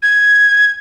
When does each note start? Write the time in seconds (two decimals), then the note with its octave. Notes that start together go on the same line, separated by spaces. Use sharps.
0.03 G#6